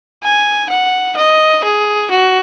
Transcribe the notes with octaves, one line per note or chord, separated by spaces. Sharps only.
G#5
F#5
D#5
G#4
F#4